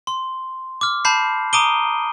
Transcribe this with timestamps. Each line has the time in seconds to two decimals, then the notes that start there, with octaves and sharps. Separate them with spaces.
0.07 C6
0.81 D6 F6
1.05 A5 B5 G6 C7
1.53 A#5 D6 D#6 D7 D#7 G7